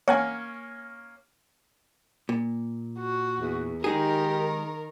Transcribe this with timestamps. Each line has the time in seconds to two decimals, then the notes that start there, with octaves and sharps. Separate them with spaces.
0.08 A#3 C#4 C#5 F#5 G#5
2.29 A#2
3.00 F#4
3.40 E2
3.84 D#3 G#3 D#4 G4 G#4 A#4